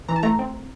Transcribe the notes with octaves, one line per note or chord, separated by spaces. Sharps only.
E3 A#5
A5
A3 A#5
C4